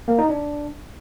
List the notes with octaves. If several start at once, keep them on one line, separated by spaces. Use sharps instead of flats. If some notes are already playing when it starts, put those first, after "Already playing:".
A#3
D#4
D4